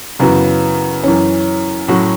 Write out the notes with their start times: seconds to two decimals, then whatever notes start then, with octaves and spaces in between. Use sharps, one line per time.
0.19 F#2 C#3 E3 B3 F#4
1.03 F#2 E3 C#4
1.88 A2 F#3 C#4 F#4